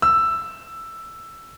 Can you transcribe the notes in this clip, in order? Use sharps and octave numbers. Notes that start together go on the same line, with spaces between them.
E6